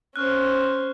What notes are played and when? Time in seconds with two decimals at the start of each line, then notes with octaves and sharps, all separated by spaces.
0.16 C#4 C5 C#6 F6 F#6